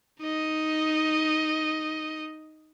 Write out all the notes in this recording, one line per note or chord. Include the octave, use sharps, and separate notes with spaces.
D#4 D#5